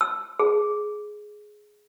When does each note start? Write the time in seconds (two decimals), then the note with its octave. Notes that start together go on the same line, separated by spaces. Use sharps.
0.01 E6
0.40 G#4